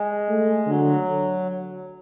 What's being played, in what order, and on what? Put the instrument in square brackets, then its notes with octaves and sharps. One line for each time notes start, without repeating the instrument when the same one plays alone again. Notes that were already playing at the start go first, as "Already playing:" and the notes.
Already playing: [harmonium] G#3
[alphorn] A3
[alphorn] D3 [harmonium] F#3